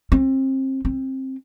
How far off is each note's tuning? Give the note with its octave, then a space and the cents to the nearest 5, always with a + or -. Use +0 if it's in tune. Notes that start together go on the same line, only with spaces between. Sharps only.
C4 +30
C4 +20